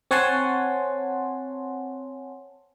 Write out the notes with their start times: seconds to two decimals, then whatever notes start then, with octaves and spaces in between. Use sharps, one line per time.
0.11 C4 C#5 F#5 G#5 A5 C6